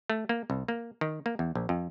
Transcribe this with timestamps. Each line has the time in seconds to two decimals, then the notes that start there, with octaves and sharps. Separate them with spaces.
0.10 A3
0.29 A#3
0.50 C2
0.68 A#3
1.01 D#3
1.26 A#3
1.39 E2
1.55 A#1
1.69 F2